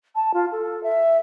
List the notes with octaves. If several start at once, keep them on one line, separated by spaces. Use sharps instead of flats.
A5
F4
A4
E5